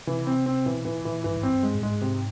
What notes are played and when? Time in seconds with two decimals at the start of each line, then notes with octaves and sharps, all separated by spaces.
0.07 C3 E3
0.27 C4
0.46 C4
0.66 B2 E3
0.85 A#2 E3
1.05 A#2 E3
1.24 G2 E3
1.37 G#2
1.43 G2 C4
1.63 G#3
1.75 A2
1.83 G#2 G#3
2.01 C3